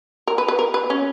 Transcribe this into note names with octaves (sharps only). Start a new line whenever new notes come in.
A#4
B4
B4
A#4
B4
C#4